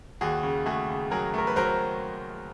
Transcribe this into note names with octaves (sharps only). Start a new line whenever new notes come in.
D#2 F#4 G#4
C#3
A3 F#4 G#4
C#3
F#3 G#4 A#4
A3 A#4
B4
F#3 A#4 C5